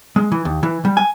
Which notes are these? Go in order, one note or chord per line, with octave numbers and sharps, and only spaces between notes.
G#3
E3
D#2
E3
G3
G#5